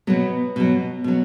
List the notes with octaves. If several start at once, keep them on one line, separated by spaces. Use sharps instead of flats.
B2 F#3 B3
B2 F#3
B2 F#3